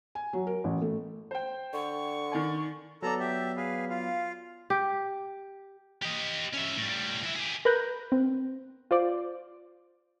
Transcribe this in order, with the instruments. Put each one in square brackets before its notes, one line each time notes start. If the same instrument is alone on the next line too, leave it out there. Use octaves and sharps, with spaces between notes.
[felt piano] G#5
F#3
A#4
A1
A3
[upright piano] C5 G5
[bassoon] D3 [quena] C#6
[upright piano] D#3 D5 G#5
[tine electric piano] F#3 B3 D5 [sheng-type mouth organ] A4 A#5
[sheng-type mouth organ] G4 E5
G#4 B4 F5
F4 F5
[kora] G4
[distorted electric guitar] G4 D#5
C#4 E5
A2 G3
E3 E5
G4 G#4
[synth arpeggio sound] A#4 B4 F#6 G6 A#6
C4
F4 C5 D5